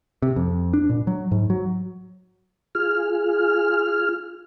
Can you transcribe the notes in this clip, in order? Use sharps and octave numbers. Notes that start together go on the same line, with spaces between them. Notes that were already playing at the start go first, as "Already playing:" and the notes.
C3
F2
D4
A#2
F#3
G#2
F#3
F4 G#4 F6